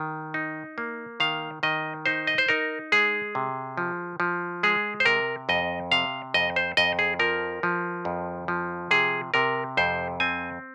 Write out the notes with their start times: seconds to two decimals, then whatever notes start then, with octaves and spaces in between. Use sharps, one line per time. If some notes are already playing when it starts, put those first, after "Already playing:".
Already playing: D#3
0.34 D#4
0.78 A#3
1.20 D#3 F5
1.63 D#3 D#5
2.06 D#4 C5
2.27 D#5
2.38 C5
2.48 D#4 A#4
2.92 G#3 G#4
3.35 C3
3.77 F3
4.20 F3
4.63 G#3 G#4
5.00 C5
5.05 C3 A#4
5.49 F2 D#5
5.92 C3 F5
6.34 F2 D#5
6.56 C5
6.77 F2 D#5
6.99 G#4
7.19 F3 A#4
7.63 F3
8.05 F2
8.48 F3
8.91 C3 G#4
9.34 C3 A#4
9.77 F2 C5
10.20 C4 G#5